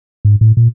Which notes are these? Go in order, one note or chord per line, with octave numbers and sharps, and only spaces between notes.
G#2
A2
A#2